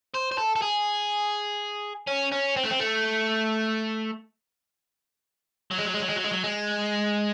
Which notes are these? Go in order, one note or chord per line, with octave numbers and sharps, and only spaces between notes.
C5
C5
A4
A4
G#4
C#4
C#4
C4
A3
C4
A3
F#3
G#3
F#3
G#3
F#3
G#3
F#3
G#3
F#3
G#3